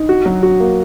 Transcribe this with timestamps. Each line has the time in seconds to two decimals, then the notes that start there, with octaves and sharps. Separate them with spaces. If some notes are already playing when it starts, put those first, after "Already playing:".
Already playing: D#4
0.09 F#4
0.26 F#3
0.43 F#4
0.60 A#3